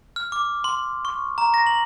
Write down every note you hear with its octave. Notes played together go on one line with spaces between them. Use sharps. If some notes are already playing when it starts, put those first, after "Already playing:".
F6
D6
C6
C#6
A#5
A#6
F#7